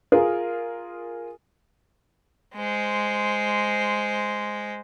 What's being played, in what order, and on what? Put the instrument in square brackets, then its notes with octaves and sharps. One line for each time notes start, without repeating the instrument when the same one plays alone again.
[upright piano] F4 G#4 A#4
[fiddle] G#3 C5